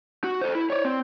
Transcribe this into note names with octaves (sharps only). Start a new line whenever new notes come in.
F#4
A4 C5
E4
C#5 D5
C4